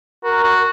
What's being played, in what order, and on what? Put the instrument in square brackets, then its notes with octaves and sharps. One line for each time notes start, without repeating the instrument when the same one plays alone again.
[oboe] F#4 [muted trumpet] A#4
[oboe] F#4